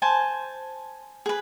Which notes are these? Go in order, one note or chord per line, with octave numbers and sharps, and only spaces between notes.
C5 G#5 A5
G#4 B4